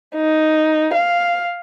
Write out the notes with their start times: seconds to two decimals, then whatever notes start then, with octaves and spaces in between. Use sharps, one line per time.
0.16 D#4
0.94 F5